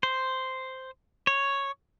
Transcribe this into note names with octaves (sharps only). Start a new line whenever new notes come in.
C5
C#5